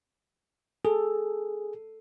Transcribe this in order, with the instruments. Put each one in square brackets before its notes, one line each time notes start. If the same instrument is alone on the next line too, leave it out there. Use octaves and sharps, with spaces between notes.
[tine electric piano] G#4 [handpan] A4